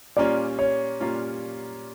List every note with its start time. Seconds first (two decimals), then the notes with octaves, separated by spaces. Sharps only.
0.16 A#2 G3 A#3 C#4 F4 D5
0.59 C#5
1.00 A#2 G3 A#3 C#4 F4